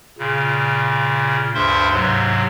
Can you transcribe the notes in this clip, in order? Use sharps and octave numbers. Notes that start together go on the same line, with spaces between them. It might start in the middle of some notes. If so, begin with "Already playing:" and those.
A#2 C#3
D2 G2 C5 E5 C6
G#2 C3 F#3